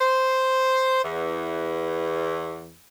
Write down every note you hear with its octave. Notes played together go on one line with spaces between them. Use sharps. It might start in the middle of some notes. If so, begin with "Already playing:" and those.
C5
E2